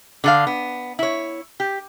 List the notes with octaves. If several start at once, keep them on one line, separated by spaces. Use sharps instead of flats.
D3 A4 F5
B3
E4 C#5
G4